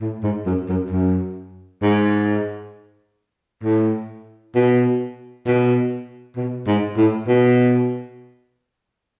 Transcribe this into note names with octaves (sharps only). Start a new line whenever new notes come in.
A2
G#2
F#2
F#2
F#2
G#2
A2
B2
B2
B2
G#2
A2
B2